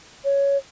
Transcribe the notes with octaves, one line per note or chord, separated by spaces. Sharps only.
C#5